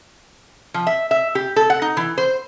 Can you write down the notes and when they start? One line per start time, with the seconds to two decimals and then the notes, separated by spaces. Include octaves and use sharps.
0.74 F3
0.87 E5
1.11 E5
1.35 G4
1.56 A4
1.70 F#5
1.82 D#4
1.97 E3
2.18 C5